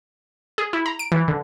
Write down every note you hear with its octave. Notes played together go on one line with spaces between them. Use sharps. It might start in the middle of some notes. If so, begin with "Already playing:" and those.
G#4
E4
A#5
D7
E3
D3